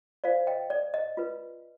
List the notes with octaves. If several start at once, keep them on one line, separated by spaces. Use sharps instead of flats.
F4 C5 D5 F5
D#5 G5
D5
D#5
F4 B4